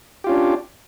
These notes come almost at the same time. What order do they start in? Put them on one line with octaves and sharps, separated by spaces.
G4 F4 C#4 D4